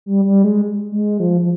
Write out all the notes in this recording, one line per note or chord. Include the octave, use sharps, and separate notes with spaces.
G3
G3
G#3
G#3
F3
F3